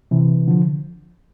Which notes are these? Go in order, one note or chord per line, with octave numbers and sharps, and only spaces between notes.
C3 E3
D3 F3